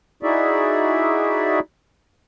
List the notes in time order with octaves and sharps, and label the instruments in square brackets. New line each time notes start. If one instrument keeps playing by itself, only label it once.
[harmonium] D#4 E4 F#4 G#4 D5 E5